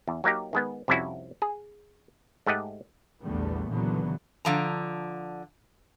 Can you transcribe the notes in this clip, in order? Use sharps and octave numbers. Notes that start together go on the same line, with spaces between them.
E2
F#3 A#3 D#4 G4
D#3 G#3 B3
C2 F2 C3 C#4 E4 F#4
G#4
G#2 A3 G4 D#5 F#5
A#1 E2 D3 G3 A3 B3
C#2 A#2 D3 E3 F#3 B3
D3 F3 A#5